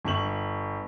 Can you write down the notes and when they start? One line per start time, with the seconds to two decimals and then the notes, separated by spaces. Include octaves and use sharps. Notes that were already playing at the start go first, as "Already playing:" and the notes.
0.04 G1 C#6 F#7